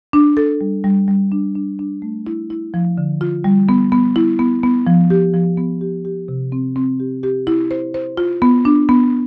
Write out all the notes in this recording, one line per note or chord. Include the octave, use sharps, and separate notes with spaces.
D4
A4
G3
G3
G3
D4
D4
D4
A3
E4
E4
F3
D3
F4
G3
B3
B3
E4
B3
B3
F3
G4
F3
B3
G4
G4
C3
C4
C4
G4
G4
E4
C5
C5
F4
B3
D4
B3